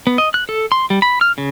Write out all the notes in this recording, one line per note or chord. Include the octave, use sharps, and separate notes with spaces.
B3
D#5
F#6
A4
C6
G3
B5
F6
C#3